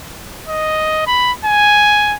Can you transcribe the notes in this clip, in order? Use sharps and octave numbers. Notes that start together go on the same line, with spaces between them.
D#5
B5
G#5